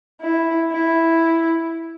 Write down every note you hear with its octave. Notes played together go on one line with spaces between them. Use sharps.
E4
E4